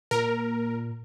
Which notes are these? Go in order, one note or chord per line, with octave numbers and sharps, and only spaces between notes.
A#2 A#4